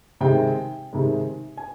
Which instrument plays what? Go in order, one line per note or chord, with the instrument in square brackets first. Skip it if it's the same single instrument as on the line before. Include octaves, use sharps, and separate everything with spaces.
[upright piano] C3 D#3 G#3 G5
C3 D#3 G#3
G#5